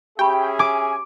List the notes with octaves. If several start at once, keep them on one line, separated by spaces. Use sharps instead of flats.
C#4 G4 G#4 E5 G5 B5 C#6
G#5 D6